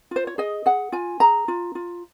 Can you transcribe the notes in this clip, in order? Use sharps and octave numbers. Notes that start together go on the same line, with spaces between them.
F4 C5
C#5
G#4 D#5
G#4 F#5
F4 G#5
G#4 A#5
F4
F4